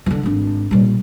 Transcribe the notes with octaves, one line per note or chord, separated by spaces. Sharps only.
D3 F3
G#1 D4
A#2 G3